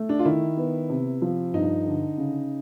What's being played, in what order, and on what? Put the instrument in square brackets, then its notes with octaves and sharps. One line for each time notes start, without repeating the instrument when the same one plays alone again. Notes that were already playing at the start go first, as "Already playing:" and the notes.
Already playing: [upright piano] A3
[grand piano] D4
F4
[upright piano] D#3 [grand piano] E4
[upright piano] B3
C3
F3
[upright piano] G2 [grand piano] D#4
[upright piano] D3
C#3